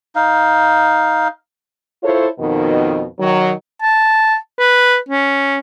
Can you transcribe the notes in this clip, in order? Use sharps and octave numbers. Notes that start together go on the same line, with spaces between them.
D#4 F5
E4 F4 A4 C5 C#5
F2 B2 D#3
D#3 F#3
A5
B4
C#4